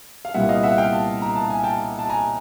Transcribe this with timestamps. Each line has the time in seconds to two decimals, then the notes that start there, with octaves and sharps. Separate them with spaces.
0.25 F5
0.34 C2 A#2 G3 B3 E4 E5 F#5
0.49 D#5 F5
0.63 E5 F#5
0.78 F5 G5
0.93 G5 A5
1.22 A#5
1.36 A5
1.50 G#5
1.64 G5 A5
1.99 A5
2.09 G#5 A#5